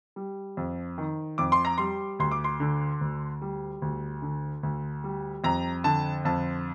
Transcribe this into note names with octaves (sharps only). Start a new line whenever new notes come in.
G3
F2
D#3
F2 D6
C6
A#5
G3 C6
D2 C6
D6
C6
D3
D2
G3
D2
D3
D2
G3
F2 A#5
D3 A5
F2 A5